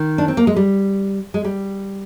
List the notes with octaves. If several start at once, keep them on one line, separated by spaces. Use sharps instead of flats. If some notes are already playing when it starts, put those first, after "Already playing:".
Already playing: D#3
D4
C4
A#3
G#3
G3
G#3
G3